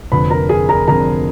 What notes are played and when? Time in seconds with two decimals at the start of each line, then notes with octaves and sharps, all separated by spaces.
0.12 F1 F2 D3 B4 B5
0.30 A#4 A#5
0.49 G#4 G#5
0.69 A#4 A#5
0.88 F1 F2 D3 A#4 A#5